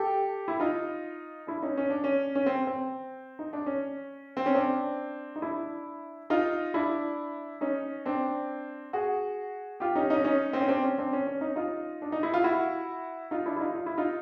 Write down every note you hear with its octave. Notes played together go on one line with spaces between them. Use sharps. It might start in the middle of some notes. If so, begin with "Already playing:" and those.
Already playing: G4 A4
E4
D#4 F4
D4 E4
C#4 D#4
C#4
D4
C#4
C#4
C4
C4
D#4
D4
C#4
C4
C#4
C4 D4
D#4
D4 E4
D#4 F4
D4 E4
C#4 D#4
C4 D4
F#4 G#4
F4 G4
C#4 D#4
C#4 D#4
C#4 D#4
C4
C#4
C4 D4
C#4
C4 D4
C#4
C#4
C#4 D#4
D#4 F4
D4
D#4
E4
F4
E4 F#4
D#4 F4
D4 E4
E4
D#4 F4
F4
E4
D#4 F4